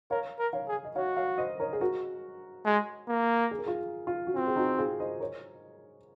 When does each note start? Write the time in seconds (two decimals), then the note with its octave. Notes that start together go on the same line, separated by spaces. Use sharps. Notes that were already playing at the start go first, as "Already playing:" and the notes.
0.11 A#4 C#5 F5
0.39 A#4
0.53 C#5 F5
0.68 G#4
0.85 D#5
0.95 F#4 C#5 F5
1.17 C#5 F5
1.38 C5 D#5
1.60 A#4 C#5
1.73 G#4
1.81 F#4 A#4
2.65 G#3
3.08 A#3
3.51 G#4
3.59 A#4
3.66 F4 G#4
4.07 F4
4.27 F#4
4.35 C4 F4
4.47 G#4
4.56 D#4 F#4
4.78 F4 G#4
5.00 C5 D#5
5.20 A#4 C#5